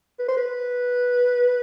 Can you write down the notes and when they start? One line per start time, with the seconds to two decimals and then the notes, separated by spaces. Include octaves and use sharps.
0.19 B4
0.28 C5
0.37 B4